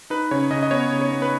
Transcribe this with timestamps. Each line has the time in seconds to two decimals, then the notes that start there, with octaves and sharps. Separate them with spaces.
0.10 D#4 B4
0.31 C#3 C#5
0.51 C#3 D#5
0.63 D#5
0.71 B3 C#5
0.92 C#3
1.01 C#5
1.12 B3
1.22 B4